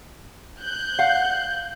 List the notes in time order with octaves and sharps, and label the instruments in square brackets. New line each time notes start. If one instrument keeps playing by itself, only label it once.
[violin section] F#6 G6
[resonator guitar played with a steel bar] F5 F#5